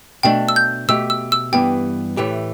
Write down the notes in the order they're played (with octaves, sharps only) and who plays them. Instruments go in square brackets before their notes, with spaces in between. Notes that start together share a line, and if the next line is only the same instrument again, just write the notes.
[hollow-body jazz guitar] B2 A3 D4 [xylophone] G5
[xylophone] E6
G6
[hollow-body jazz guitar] B2 A3 G4 [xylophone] E6
[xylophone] E6
E6
[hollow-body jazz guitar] G2 E3 B3 G4 [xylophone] G5
[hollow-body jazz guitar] A2 E3 A3 G4